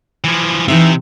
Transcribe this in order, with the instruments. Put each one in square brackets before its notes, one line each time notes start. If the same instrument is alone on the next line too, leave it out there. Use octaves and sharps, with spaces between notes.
[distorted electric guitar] E3 F3
[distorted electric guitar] C3 [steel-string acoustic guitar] E3 D#4 E5